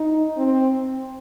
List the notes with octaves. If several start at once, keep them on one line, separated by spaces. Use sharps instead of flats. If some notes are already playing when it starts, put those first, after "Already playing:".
Already playing: D#4
C4